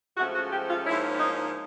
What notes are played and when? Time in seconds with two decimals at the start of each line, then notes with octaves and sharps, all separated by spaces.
0.17 G#2 F3 A3 C#4 F#4
0.34 F#4
0.51 G4
0.69 F4
0.86 G#2 F3 A#3 C#4 E4
1.20 D#4